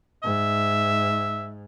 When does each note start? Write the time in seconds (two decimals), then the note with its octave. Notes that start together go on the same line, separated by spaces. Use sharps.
0.23 G#2 E5